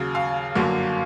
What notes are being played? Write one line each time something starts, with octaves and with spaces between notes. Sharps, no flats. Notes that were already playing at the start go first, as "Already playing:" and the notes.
Already playing: D#2 C#3 F#3
F5
G1 F#2 D3 F#3 A#3